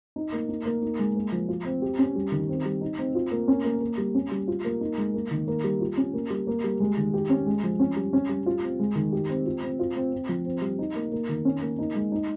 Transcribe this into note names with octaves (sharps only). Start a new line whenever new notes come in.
D#4
A#3
D#4
A#3
D#4
G#3
A#3
F3
F4
C4
G4
C#4
G3
D#3
C4
G3
D#4
C4
F4
A#3
C#4
A#3
A#3
G3
C#4
G3
F4
A#3
D#4
G#3
A#3
D#3
A#3
G3
F4
C#4
A#3
G3
A#3
G3
G#3
D#3
G4
C#4
G#3
F3
C#4
G3
C#4
G3
F4
C4
G#3
D#3
G4
C4
F4
C4
F4
C4
C4
F3
C4
G3
D#4
A#3
A#3
D#3
C#4
A#3
D#4
G#3
D#4